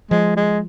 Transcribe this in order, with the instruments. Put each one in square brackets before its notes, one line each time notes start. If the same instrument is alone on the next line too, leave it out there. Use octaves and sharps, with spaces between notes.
[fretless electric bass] F3 [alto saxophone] G#3
[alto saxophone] G#3